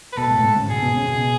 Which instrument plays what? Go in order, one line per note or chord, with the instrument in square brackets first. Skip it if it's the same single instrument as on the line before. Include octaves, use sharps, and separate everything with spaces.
[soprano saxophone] B4
[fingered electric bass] B2 B3 [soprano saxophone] A4
[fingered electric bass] A2 A3
G#2 G#3
C#3 C#4
[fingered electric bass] B2 B3 [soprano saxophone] G#4
[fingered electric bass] B2 B3
C#3 C#4
B2 B3